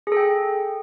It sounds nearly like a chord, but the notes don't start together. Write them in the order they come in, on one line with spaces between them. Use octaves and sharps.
G#4 A4 G5